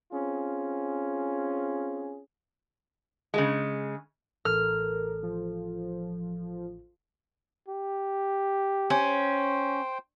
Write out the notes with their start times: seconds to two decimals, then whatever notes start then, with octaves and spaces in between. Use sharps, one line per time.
0.12 C4 C#4 F4 G#4
3.34 C#3 G#3
4.45 A1 A4 A#4 F6
5.23 F3
7.68 G4
8.90 C#4 C5 G5